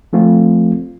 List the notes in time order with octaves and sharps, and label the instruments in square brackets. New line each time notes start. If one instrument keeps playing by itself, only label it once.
[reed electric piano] F3 A3 C4 F4